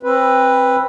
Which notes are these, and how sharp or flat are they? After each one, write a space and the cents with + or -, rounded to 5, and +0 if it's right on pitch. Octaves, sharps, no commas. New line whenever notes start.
C4 +20 B4 +0